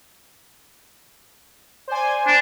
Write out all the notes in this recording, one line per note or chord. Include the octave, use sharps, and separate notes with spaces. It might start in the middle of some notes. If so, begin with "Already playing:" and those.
C5 D5 G#5
D4